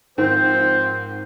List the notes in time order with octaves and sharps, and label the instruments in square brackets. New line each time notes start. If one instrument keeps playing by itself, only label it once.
[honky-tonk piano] G#2 D#3 [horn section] F3 C4 [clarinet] C5